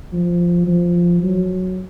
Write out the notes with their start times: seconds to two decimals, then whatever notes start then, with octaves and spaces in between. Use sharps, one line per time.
0.13 F3
0.68 F3
1.23 F#3